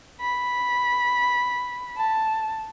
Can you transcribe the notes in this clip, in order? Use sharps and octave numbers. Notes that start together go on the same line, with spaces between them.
B5
A5